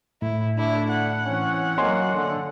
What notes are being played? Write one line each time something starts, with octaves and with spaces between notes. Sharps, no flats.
A2 E4
D2 A3 D4 E4
F#5
E3 C4 C#4
F#3 A#3 C#5 D#5 G#5 C6
D3